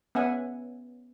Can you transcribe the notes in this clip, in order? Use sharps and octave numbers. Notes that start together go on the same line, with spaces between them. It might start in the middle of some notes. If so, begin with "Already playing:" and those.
B3 C#4 E5 F#5 G#5